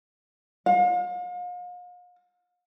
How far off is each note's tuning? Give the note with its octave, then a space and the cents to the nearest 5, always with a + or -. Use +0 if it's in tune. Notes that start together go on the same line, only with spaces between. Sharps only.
F5 +40